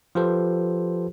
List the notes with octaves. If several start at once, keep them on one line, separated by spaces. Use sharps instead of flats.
F3 F4 G4 A4 B4 C5